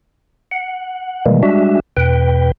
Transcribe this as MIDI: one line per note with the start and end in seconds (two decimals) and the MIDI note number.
0.51 1.25 78
1.26 1.43 47
1.26 1.43 51
1.26 1.43 52
1.26 1.43 55
1.26 1.43 56
1.26 1.43 58
1.43 1.80 55
1.43 1.80 56
1.43 1.80 62
1.43 1.80 66
1.43 1.80 76
1.97 2.52 40
1.97 2.52 47
1.97 2.52 71
1.97 2.52 79